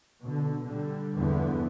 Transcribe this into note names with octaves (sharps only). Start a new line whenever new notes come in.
B2 D3
D3 G3
E2 G2 D3 F3 B3